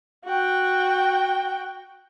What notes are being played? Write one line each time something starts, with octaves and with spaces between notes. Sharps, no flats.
F#4 G5